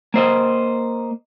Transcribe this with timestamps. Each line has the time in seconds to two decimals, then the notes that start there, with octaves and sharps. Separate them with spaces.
0.14 A#3 C5 D#5